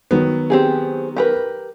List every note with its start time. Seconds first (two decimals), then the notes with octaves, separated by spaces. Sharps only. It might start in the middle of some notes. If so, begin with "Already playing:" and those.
0.11 D#3 F#3 B3
0.50 C4 G4 G#4
1.17 G4 A#4 B4